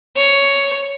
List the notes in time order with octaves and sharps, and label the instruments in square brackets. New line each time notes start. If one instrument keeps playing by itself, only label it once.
[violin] C#5